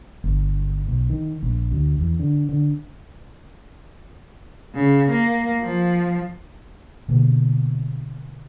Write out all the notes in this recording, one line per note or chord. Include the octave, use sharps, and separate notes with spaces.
G1
B1
D#3
A#1
D2
E2
D3
D3
C#3
A#3
F3
B2 D3 A#3